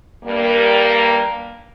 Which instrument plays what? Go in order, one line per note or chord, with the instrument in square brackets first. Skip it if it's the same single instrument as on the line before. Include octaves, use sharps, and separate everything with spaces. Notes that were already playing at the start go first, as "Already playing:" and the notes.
[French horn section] G2 G3 A#3